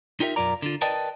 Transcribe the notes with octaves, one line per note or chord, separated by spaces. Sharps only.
D#4 F4 G4 A#4 B4 E5
B1 F#2 F4 A#4 D5 A#5
D3 F4
A#4 B4 D5 D#5 G5 A5